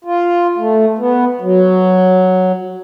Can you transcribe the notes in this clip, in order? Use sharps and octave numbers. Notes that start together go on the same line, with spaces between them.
F4
A3
B3
F#3